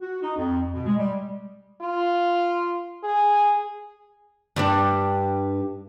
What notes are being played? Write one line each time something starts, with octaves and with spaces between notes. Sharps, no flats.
F#4
D#4
F2
B2
G#3
G3
F4
G#4
G2 G3 D4